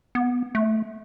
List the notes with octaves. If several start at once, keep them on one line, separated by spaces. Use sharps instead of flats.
B3
A3